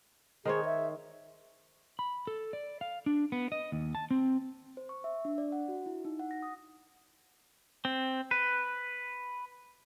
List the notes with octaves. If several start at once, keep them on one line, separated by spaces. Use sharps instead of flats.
D#3 G#4 C5 C#5
E5
B5
A4
D5
F5
D4
B3
D#5
D#2
A5
C4
C5
C#6
E5
D4
D5
F#5
F#4
E4
D#4
F#5
A#6
D#6
C4
B4